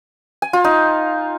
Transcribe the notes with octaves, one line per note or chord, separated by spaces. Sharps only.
G#5
F4
D#4